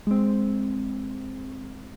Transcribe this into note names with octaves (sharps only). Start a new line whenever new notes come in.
G#3 C4